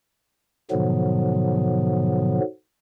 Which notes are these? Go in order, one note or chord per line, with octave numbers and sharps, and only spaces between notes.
G#2 B2 D3 F3 F#3 B3